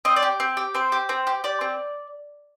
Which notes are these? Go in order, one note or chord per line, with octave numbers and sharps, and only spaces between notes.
C4 D#5
D5
G4
C4
G4
C4 C5
G4
C4
G4
G4 D5
C4